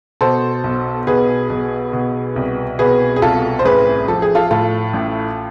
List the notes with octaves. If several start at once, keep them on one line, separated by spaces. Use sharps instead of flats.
B2 A4 C5
B1
B2 G#4 B4
B1
B2
C2
B2 G#4 B4
G#4
C2 F4 A4
C5
A1 G#4 B4
F3 A4
G#4
F4 A4
A2 F4 A4
A1